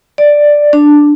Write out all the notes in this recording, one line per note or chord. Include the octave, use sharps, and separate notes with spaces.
D5
D4